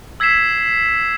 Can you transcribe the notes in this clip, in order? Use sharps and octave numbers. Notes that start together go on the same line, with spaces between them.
E6 G#6 B6 C7 E7